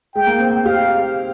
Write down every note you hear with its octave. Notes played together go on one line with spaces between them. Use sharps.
G#3 G5
A#3
C4
G4 F5